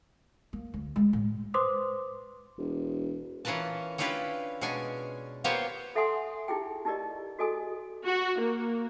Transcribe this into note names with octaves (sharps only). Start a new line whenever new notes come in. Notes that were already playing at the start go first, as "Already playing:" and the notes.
A#3
D2
G#3
A2
B4 C5 C6 D6 D#6
E1
E3 C#4 F4 A#4 B4 A5
C#4 D4 E4 F4 G4 B4
B2 G#3 C#4 D4 G#5
A#3 B3 F4 G4 C5 C#5
A4 E5 F#5 G#5 C6 D#6
D#4 E4 G4 G#4 G5
D#4 E4 G4 A#4 D5 D#5
F#4 G#4 A4 D#5 G#5 D#6
F#4
A#3